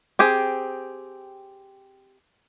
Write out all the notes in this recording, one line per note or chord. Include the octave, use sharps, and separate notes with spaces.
C4 G4 G#4